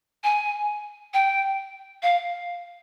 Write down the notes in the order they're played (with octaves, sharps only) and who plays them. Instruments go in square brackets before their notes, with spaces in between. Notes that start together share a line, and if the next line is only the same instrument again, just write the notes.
[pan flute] G#5
G5
F5